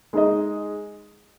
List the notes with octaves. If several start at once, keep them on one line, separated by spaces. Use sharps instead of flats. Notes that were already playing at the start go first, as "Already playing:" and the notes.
G#3 D#4 G#4 D#5